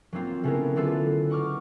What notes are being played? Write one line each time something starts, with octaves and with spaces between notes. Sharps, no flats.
F#3 A#3 C4 F4
C#3 A3 B3 C#4 E4 A#4
D3 F#3 E4 F4 A4 B4
D#4 F#5 C#6 D6 F6